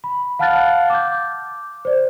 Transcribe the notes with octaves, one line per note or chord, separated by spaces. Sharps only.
B5
F5 F#5 A5 F6 F#6 A6
D6 G6
C5 D5